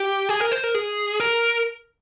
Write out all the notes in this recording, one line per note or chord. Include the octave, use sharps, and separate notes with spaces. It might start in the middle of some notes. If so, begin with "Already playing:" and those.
Already playing: G4
G#4
A#4
C5
A#4
G#4
A#4